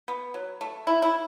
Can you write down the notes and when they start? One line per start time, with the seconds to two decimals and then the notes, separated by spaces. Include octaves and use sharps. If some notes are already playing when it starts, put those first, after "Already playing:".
0.08 B3
0.34 F#3
0.61 A3
0.87 E4
1.02 E4